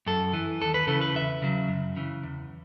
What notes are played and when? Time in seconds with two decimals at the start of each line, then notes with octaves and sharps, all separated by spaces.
0.06 F#2 A4
0.33 E3
0.61 D#2 A4
0.74 B4
0.87 C#3 E3 A4
1.01 B4
1.15 E2 E5
1.42 C#3 F#3
1.69 F#2
1.96 C#3 E3
2.23 E2